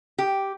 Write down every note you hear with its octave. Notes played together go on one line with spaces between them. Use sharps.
G4